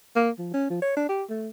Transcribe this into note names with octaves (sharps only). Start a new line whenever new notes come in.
A#3
F3
C#4
F3
C#5
D4
G4
A3